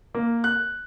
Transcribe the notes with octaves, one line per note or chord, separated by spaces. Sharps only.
A#3
F#6